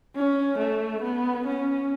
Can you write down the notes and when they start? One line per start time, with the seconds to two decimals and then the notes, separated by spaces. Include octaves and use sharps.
0.16 C#4
0.59 A3
1.03 B3
1.47 C#4